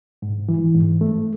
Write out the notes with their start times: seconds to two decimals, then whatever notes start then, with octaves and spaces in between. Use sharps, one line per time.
0.22 G#2
0.49 E3
0.75 G#2
1.01 A3